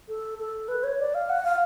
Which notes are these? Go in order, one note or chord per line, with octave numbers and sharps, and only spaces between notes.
A4
A4
B4
C#5
D5
F5
F#5
F5